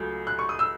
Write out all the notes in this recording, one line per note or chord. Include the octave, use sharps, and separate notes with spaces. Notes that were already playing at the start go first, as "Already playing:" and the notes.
Already playing: C#2 C#3 F#3 A3
F#6
C#6
D#6
E6